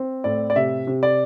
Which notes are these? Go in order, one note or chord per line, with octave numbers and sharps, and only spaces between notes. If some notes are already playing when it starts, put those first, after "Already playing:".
Already playing: C4
A2 D5
D5
C3 E5
C3
D5